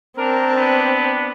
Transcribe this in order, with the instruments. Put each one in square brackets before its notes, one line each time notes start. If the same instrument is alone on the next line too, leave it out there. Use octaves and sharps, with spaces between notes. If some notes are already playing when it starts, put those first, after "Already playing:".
[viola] C4 [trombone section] D4 A#4
[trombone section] B3 D4